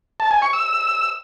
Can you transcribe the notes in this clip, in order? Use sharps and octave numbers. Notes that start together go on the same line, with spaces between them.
A5
G#5
C#6
E6